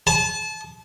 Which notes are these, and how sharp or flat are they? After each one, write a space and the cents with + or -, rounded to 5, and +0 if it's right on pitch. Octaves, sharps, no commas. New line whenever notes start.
A5 -30